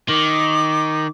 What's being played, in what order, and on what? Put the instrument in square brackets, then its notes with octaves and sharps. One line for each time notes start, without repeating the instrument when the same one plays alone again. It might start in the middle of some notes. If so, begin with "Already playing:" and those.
[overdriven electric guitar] D#3 [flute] D6